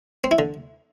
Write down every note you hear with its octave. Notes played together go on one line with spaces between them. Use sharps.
C4
E4
D3